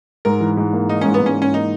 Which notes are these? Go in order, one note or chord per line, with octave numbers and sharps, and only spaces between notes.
G#2 A#4
E3
G#2
A#3
A#3 D#4
G#2 C#4
B3
G#2 C#4
G#2 C#4
A#3 D#4